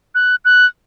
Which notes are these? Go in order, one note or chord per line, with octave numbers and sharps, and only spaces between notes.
F#6
F#6